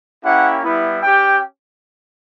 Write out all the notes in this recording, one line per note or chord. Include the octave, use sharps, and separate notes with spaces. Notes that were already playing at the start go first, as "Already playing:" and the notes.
A#3 C#4 E4 G4 F#5
G3 B3 E4
C#4 G4 G5